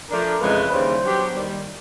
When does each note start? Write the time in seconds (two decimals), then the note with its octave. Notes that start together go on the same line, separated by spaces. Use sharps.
0.10 F3 A3 D4 A#4
0.41 F2 C#3 E3 G#3 B4
0.72 D#2 C#3 E3 G3 C5
1.03 F#3 B3 D4 G4
1.34 D#2 D#3 G3